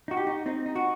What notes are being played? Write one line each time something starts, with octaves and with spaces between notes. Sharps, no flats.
D#4 F#4
G4
D#4
C4 D#4
D#4
F#4